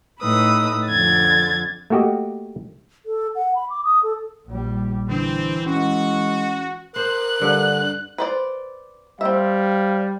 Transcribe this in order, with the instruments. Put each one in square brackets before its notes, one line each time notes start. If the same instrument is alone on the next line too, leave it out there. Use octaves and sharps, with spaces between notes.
[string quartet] A2 D#4 B4 D#6 E6
F2 D3 G#6 A6
[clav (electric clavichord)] A3 A#3 F#4 G4 D#5
[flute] A4
F#5
B5
D6
D#6
A4
[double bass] A#1 G3
[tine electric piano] D3 D4 [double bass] E3 [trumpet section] C4
[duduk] G#3 [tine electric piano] C#4 [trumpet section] F#4
[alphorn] A#4 [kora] C5 [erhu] F#6
[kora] G2 [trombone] D3
[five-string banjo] B4 C5 D5
[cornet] G3 [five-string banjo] C4 E5 [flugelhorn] F5